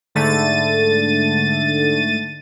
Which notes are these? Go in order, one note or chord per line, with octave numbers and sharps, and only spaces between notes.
G#2 D3 A3 A6 D#7